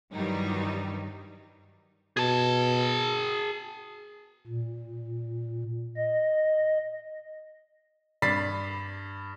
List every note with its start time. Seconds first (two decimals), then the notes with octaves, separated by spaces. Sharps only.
0.14 G2 D#3 E3 F#3 G3 D#4
2.17 B2 G#4 A5
4.47 A#2
5.97 D#5
8.22 G2 D5 B5 A6 B6 C7